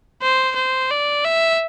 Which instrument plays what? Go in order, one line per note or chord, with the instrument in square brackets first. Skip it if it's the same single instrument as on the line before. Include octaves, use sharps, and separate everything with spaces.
[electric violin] C5
C5
D5
E5